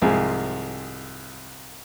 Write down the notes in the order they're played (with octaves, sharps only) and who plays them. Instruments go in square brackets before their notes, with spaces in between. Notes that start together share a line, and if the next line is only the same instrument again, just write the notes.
[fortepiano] C2 G#2 F3 C4 G#4